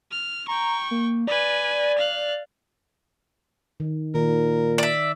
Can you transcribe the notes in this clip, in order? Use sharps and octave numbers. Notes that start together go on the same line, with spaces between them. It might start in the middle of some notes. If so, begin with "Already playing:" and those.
F6
G5 A#5 C#6
A#3
B4 D5 G#5
F5 F#6
D#3
A#2 D#3 A#4
D5 E5